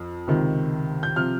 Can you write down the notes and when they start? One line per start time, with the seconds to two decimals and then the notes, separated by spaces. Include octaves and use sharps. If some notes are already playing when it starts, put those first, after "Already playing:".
Already playing: F2
0.27 C#2 C3 D#3
1.03 G6
1.16 C3 F3 F6